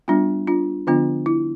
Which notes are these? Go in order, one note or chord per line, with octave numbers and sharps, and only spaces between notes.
G3 B3 D4 F4
D4 F4
D3 F3 B3 D4 F4
E4